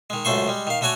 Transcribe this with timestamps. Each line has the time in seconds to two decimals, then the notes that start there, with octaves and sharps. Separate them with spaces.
0.10 D#3 G#3
0.25 C#2 F#2 A3 C5 C#6
0.48 G3 G#3
0.67 D#3 F5
0.81 D3 A3 F#4 C#5 F#5 G#5